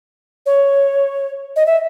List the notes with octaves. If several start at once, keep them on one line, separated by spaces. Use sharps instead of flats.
C#5
D#5
E5